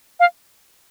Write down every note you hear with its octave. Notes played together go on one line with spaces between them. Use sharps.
F5